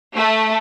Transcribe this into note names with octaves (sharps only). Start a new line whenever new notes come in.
A3